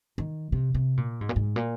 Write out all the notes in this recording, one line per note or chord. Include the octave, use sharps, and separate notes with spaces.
D#3
C3
C3
A#2
G#2
A#2
G#2
A#2